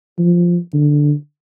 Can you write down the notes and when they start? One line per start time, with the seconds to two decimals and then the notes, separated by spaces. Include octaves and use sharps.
0.18 F3
0.74 D3